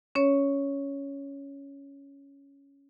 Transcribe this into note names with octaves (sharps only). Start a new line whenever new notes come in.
C#4 C#5